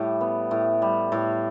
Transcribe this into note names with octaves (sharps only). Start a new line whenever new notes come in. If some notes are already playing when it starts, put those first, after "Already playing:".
Already playing: A2 G3 G5
B3
A2
G3
A2